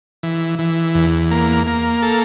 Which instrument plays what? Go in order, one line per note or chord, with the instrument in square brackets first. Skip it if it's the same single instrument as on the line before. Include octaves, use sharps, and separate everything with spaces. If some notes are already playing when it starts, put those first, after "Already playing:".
[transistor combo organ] E3
E3
E2
A#3
A#3
A4